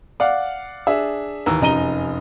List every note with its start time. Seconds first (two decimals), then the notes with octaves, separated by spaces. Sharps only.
0.20 D5 F5 F#5
0.87 D4 G#4 E5
1.46 D#2 E3 A#5 E6
1.61 F1 F#2 D#4 A#5 D#7 G7